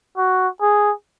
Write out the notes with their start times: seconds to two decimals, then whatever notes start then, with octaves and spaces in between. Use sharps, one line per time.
0.17 F#4
0.61 G#4